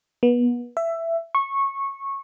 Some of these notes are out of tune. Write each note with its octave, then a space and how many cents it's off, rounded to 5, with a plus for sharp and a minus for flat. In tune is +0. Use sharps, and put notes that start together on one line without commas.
B3 -30
E5 +15
C#6 -15